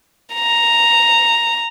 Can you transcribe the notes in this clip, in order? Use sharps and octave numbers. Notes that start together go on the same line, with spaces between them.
A#5